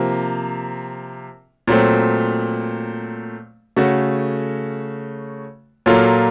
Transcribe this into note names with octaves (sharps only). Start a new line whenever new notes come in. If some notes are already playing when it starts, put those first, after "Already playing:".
Already playing: C3 F3 A#3
A#2 F#3 A3 C4
C#3 A3 C#4 F#4 A4
A#2 F#3 A#3 F4 A4